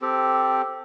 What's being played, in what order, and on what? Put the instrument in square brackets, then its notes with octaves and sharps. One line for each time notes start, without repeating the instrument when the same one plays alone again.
[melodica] C4 G4 A4